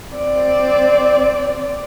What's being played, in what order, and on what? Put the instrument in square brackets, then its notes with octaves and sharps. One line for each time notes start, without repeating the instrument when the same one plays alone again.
[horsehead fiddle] C4 D5